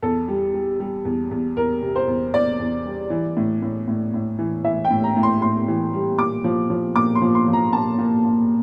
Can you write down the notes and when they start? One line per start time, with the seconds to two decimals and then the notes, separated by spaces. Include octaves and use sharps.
0.02 E2 A4
0.28 G3
0.54 G3
0.80 G3
1.05 E2
1.31 E2
1.57 E2 A#4
1.82 C3
1.96 C5
2.07 E2
2.34 E2 D5
2.59 E2
2.85 G3
3.10 E3
3.37 A2
3.62 A2
3.88 A2
4.14 A2
4.39 E3
4.64 E3 E5
4.85 G5
4.91 A2
5.04 A#5
5.16 A2
5.23 C6
5.42 A2 C6
5.68 E3
5.93 G3
6.19 A#2 D6
6.44 F3
6.70 F3
6.96 A#2 D6
7.15 C6
7.22 F3
7.35 C6
7.48 F3
7.53 A#5
7.73 A#2 A5
7.99 A#2
8.25 A#2